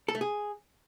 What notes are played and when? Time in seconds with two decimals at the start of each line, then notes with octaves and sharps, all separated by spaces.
0.08 A4
0.15 A3
0.21 G#4